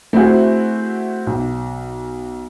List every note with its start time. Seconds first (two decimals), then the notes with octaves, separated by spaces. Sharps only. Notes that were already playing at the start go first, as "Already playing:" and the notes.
0.13 A3 C4 E4 F#4 G#4
1.27 B1